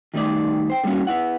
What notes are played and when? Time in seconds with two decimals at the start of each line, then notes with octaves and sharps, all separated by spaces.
0.14 D#3 G3 A3 D#4 D5
0.70 C5 G5
0.84 D3 G3 A#3 C#4 F#4
1.07 B3 E4 F#5